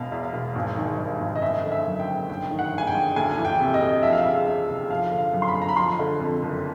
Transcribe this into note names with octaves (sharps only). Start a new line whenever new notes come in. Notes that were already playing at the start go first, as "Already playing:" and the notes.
Already playing: E1 B2 F5
E2
E1
G#1
D#3
G2
G#1
D#5
F#1 E5
D3
E5
F#2
G5
F#1
G1 G5
D#3
F#5
G2
G#5
G5
G1
D2 G#5
E3
G5
C3
D#5
D2
F3 E5
F5
C#3 E5
E2
F1
F3 F5
D3
F5
F#2
C6
B5
G1
A#5
B5
F3 C6
D3
F2
F#1